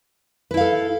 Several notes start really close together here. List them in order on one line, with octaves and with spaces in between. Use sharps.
B4 E4 F5 A4